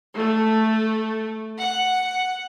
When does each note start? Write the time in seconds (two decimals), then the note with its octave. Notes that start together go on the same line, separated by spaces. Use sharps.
0.16 A3
1.62 F#5